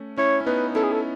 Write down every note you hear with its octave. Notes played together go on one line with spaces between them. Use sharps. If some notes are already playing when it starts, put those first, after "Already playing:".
Already playing: A3 C#4
C#4 E4 C#5
C#4
B3 D#4 B4
C#4 E4 A4
G#4
A4